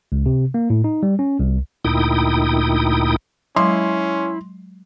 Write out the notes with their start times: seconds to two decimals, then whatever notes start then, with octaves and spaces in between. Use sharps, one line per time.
0.12 C#2
0.26 C3
0.54 A#3
0.70 A2
0.84 D#4
1.03 G3
1.19 C#4
1.39 C2
1.85 D2 A#2 D#4 E4 G5 D#6
3.56 F#3 G#3 C#4 E4 C6